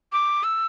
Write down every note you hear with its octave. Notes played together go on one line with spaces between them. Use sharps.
D6
E6